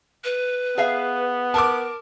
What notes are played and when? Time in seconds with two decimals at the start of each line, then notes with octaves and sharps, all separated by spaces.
0.24 B4
0.78 B3 G#4 E5 F5
1.54 A#4 A5 D6